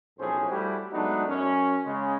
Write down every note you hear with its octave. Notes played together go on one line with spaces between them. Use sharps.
B1 F2 A2 C#4 G#4 C5
G3 A3 E4 F#4 G4
F#3 G#3 A3 B3 D4 D#4
F#2 C#4
C#3 G#3 C#4